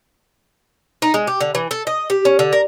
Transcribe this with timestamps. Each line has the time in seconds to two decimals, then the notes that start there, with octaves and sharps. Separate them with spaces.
1.02 D#4
1.14 G#3
1.27 G4
1.41 D3
1.55 E3
1.71 A4
1.87 D#5
2.10 G4
2.25 C#4
2.39 D3
2.53 A#4